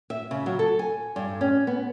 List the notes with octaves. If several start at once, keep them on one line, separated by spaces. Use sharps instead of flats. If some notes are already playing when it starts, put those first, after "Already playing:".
E5
C#3
F#3
A4
G#5
G2
C#4
B3